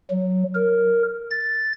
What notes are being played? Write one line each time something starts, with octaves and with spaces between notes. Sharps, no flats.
F#3
A#4
A6